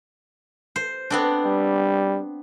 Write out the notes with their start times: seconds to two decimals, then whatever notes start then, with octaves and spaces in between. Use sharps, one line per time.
0.76 C5
1.10 B3 C4 D4
1.45 G3